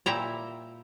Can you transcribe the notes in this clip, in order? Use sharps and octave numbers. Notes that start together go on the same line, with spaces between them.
A#2 E4 E5 G5 A#5